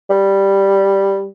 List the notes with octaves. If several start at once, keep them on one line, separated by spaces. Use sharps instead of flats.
G3